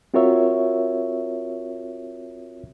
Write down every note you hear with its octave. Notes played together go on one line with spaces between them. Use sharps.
C4 F4 F#4 A#4 C#5 E5